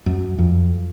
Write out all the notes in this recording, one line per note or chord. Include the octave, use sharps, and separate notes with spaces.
F#2
F2